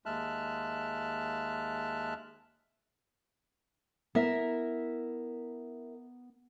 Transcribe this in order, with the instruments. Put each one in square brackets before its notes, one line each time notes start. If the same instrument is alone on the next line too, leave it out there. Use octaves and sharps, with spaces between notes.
[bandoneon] D#2 G#3 E5 A5 F6 F#6
[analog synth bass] B3 [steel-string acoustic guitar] E4 A#4 E5